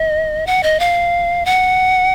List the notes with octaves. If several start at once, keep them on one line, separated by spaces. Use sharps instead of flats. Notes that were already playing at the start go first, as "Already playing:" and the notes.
Already playing: D#5
F#5
D#5
F5
F#5